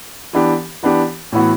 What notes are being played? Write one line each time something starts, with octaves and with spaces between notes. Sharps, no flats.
E3 B3 D4 G4
E3 B3 D4 G4
A2 E3 B3 F#4